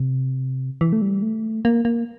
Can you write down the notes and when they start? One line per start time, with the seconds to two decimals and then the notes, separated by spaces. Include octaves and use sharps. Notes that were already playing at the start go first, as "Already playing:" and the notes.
Already playing: C3
0.81 E3
0.93 A3
1.02 G3
1.22 A3
1.65 A#3
1.85 A#3